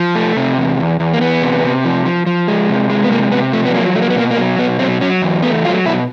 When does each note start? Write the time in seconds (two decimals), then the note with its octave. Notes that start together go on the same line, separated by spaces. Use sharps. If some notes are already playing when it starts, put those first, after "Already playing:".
Already playing: F3
0.15 A3
0.37 C3
0.58 E2
0.79 E2
1.00 E2
1.13 A#3
1.21 E2 B3
1.42 C3
1.64 C3
1.85 F3
2.06 F3
2.26 F3
2.48 G#3
2.69 C3
2.90 G#3
3.04 B3
3.11 C3 A#3
3.31 C3 B3
3.53 F3 A3
3.65 B3
3.75 F#3 A#3
3.95 A3
4.02 A#3
4.10 B3
4.16 B2 A#3
4.31 A#3
4.37 F#3
4.58 B2 B3
4.79 F#3 C4
5.01 F#3 C#4
5.22 E2
5.43 A3 B3
5.64 F#3 F4
5.85 B2 E4